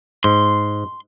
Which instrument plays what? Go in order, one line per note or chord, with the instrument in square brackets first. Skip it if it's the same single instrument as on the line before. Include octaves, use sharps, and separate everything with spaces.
[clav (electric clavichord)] G#2 [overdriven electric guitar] C6